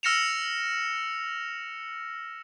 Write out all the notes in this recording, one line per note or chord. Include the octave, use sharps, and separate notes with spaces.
E6 F6 A#6 C#7 E7 F7